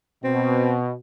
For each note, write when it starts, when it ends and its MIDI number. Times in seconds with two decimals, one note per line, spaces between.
0.24 0.94 47
0.24 0.74 60